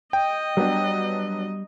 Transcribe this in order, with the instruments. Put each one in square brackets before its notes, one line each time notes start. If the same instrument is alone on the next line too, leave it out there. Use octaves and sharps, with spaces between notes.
[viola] D#5 [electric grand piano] G5
[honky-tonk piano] F#3 B3 D4 [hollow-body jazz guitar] G3